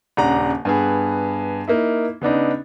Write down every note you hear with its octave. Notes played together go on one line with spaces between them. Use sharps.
D#1 C#3 D4 F#5 A#5
G2 B3 G#4
A#3 D#4 E4
C#3 B3 D4 D#4